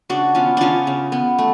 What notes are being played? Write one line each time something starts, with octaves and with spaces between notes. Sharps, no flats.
C#3 D4 F#4
B3 C#4 F4
C#3 C#4 D4 F4
C#3
B3
A3